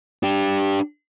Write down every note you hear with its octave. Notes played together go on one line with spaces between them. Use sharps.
D4 G4